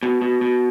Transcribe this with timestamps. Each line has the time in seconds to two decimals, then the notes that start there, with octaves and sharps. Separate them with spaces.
0.03 B2
0.22 B2
0.41 B2